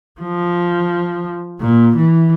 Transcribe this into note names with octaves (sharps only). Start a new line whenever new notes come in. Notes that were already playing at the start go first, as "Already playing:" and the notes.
F3
A#2
E3